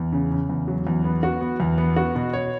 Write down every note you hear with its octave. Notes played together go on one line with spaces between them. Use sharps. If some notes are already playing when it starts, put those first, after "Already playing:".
Already playing: E2
C#3
C#3
E2
F#3
E2
B3
F#4
B3
E2
B3
F#4
B2
C#5